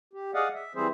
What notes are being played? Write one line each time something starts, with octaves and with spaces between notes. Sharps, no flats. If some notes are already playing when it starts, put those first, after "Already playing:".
G4
G#4 D5 D#5 F5 F#5
E5
E3 G3 C4 G#4 C5 E5